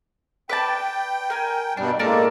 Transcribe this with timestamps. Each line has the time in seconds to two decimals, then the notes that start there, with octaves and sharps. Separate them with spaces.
0.49 B4 D5 G5 A5
1.30 A#4 G#5
1.77 G2 B2 G3 D4
1.99 A2 G#3 A#3 A4 A#4 D5